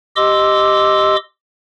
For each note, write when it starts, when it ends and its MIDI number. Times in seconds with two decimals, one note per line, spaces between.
0.16 1.16 67
0.16 1.16 75
0.16 1.16 84
0.16 1.16 86
0.16 1.16 88